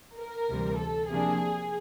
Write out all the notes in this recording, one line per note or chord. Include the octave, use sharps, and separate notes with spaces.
A#4
D2 C3 E3 G3
A4
C3 F3 A#3 D4 G#4